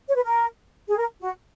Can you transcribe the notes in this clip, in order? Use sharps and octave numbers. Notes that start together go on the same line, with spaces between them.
C#5
B4
A#4
G#4
A#4
F#4